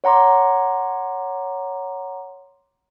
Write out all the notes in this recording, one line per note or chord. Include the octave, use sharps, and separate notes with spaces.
C#5 F#5 A#5 C6 D6